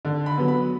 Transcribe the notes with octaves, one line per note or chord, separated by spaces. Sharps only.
D3
B5
F#3 B3
B5